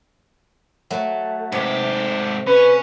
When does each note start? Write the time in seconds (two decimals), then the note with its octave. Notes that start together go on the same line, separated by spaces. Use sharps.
0.90 F#3 A3
1.52 G#2 C3 G4
2.47 C#4 B4